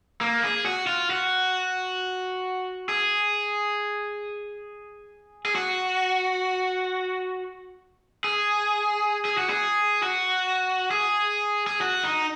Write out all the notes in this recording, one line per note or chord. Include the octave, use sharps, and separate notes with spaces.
A#3
G#4
F#4
F4
F#4
G#4
G#4
F#4
G#4
G#4
F#4
G#4
F#4
G#4
G#4
F#4
D#4